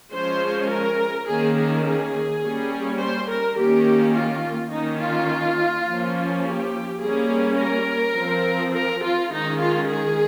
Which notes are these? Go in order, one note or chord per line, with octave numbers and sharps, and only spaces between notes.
F3 G#3 C#4 C5
A#4
D#3 A#3 C#4 G#4
G#4
G#4
G3 A#3 C#4
C5
A#4
D#3 A#3 C#4 G4
F4
D#3 A#3 C#4 D#4
F4
F3 A#3 C#4
G4
G3 A#3 C#4 G#4
A#4
F3 C4
A#4
F4
D#3 G#3 C#4 D#4
F4
G#4